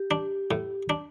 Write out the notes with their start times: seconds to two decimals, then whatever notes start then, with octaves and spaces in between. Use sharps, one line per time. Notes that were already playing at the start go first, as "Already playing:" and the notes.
Already playing: G4
0.11 D4
0.51 A2
0.90 D4